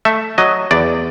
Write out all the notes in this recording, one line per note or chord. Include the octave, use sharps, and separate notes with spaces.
A3 E5
F#3 D#5
E2 D5